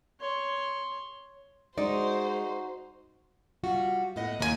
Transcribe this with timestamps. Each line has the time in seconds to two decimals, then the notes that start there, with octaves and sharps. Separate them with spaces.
0.20 C#5 C6
1.78 G#3 D#4 F#4 C5 D5
3.64 G3 F4 F#4
4.16 A2 B3 E4 D#5 F#5
4.40 D#2 A#3 D#4 E4 G#5